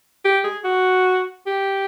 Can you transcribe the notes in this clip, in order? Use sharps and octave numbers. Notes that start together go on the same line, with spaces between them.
G4
G#4
F#4
G4